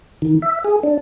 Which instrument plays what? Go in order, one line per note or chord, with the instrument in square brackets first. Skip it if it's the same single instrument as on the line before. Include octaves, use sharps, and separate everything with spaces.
[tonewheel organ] D#3
E5
G#4
D4